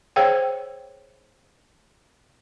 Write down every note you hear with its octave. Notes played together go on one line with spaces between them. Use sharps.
G#4 C5 C#5 F5 G5